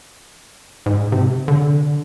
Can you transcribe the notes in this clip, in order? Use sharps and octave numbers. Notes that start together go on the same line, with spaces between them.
G#2
C3
D3